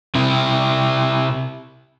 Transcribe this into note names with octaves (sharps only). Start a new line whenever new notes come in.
C3 E4